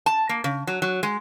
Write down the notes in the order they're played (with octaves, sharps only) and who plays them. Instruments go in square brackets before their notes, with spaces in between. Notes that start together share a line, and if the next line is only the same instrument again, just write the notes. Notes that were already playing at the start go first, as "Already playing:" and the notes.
[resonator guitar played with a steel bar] A5
A#3
C#3
F#3
F#3
G#3